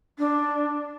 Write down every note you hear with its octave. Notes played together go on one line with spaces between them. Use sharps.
D4